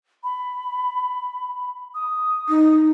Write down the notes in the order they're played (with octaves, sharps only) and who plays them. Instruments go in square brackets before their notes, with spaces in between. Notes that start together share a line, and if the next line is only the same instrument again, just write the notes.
[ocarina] B5
D#6
[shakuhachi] D#4